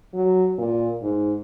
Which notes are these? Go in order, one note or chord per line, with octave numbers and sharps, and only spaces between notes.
F#3
A#2
G#2